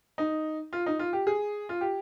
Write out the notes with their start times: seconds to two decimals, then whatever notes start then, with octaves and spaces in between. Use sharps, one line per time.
0.18 D#4
0.73 F4
0.86 D#4
0.99 F4
1.13 G4
1.27 G#4
1.69 F4
1.81 G4